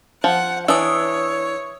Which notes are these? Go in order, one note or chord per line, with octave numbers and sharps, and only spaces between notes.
F3 F#5
E3 D4 C#5 D#6 E6